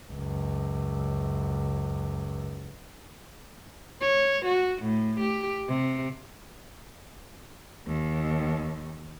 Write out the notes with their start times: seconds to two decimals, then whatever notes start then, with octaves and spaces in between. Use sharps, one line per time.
0.11 C#2 F#2
4.01 C#5
4.46 F#4
4.83 A2
5.20 G4
5.68 C3
7.87 D#2